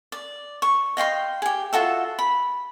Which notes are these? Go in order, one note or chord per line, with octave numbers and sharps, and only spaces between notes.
D5
C#6
D#5 F5 G5 C6
G4 G#4
F4 F#4 A4 E5
B5